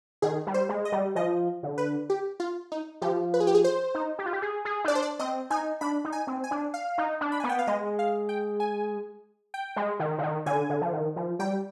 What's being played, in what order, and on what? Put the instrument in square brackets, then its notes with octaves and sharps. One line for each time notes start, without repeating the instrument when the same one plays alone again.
[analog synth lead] D#3 [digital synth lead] G#4
[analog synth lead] G3
[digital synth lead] C5
[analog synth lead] G#3
[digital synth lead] D#5
[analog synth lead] G3
[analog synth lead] F3 [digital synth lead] D#5
[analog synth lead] D3
[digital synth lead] B4
G4
F4
D#4
[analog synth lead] F3 [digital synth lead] G4
[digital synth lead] B4
G#4
G4
G#4
C5
[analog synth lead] D#4
G4
F4
G4
G#4
G#4
D#4
[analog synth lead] D4 [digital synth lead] D5
[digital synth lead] C5
D5
[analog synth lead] C4 [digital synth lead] D#5
[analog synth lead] D#4 [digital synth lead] G#5
[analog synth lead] D4 [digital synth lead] B5
[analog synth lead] D#4
[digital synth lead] G#5
[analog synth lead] C4
[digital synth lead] G#5
[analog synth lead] D4
[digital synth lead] F5
[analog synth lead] D#4
D4
[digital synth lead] B5
[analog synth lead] B3 [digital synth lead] G#5
[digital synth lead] G5
F5
[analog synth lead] G#3 [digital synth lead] D#5
[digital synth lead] F5
G5
G#5
G5
[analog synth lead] G#3
D#3
D3
D#3
[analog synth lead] D3 [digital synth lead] G#5
[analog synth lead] D3
F3
D#3
F3
[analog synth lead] G3 [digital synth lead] G5